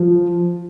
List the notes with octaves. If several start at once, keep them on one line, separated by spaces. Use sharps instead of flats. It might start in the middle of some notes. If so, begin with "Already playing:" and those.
Already playing: F3